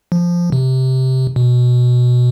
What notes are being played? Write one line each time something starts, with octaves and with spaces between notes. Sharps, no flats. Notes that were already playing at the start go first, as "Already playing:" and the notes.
F3
C3
B2